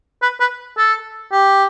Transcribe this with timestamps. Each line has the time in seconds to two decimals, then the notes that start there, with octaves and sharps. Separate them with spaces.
0.22 B4
0.40 B4
0.77 A4
1.32 G4